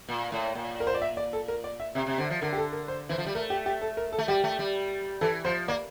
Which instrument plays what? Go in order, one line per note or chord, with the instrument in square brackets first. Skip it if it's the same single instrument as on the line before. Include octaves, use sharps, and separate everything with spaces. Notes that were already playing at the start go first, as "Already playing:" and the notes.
[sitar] A#2
A2
A#2
[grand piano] A#4
C5
D5
E5
D5
A4
A#4
D5
E5
[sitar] C3 [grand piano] E5
[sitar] C3
[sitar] D3 [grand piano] C5
[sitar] F3
[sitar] D3 [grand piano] A#4
[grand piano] G4
A4
A#4
C5
[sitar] E3 [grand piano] C5
[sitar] F3
G3
[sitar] A3 [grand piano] A#4
[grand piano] G4
G4
A4
A#4
A4
[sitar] A3
[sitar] G3 [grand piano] G4
[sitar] A3
G3
[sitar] E3 [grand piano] A4
[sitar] F3 [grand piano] C5
[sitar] A#3 [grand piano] D5